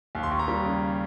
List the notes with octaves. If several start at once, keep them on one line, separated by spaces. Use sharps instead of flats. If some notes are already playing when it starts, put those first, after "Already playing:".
D#2
C6
D#2 C#6
A#5
G3
C#3